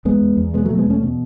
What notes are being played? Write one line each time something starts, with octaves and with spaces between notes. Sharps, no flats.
E2 G#3 B3
E2
E2
B2 G#3 B3
F#3 A3
B2
G#3 B3
E2 A3 C#4
B2